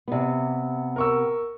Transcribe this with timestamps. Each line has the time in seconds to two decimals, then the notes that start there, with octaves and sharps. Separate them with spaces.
0.08 C3 B3
0.96 A#4 C#6 E6